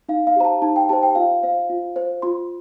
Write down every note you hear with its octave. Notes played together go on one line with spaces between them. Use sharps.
D#4 F5
F5
G4 C5 A#5
A5
D#4 A5
G5
G4 C5 A5
G5
F4 F5
C5 F5
F4
C5
F4 C6